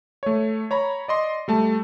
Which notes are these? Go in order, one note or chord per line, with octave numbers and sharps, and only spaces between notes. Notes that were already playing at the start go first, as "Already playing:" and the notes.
A3 C#5
C#5 A#5 B5
D5 D#5 C6
G3 A3 A5